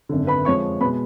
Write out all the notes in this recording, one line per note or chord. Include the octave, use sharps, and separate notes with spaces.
G#1 F#2 D3
B4 B5
F2 F3 G#3 C#5 C#6
B2 G#3 B4 B5